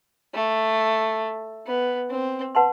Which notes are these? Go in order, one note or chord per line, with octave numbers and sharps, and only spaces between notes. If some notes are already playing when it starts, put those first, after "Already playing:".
A3
B3
C4
B4 F#5 A5 C6